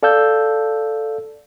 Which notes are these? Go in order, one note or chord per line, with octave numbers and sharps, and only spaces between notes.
A4 D5 F5 A5 E6 G6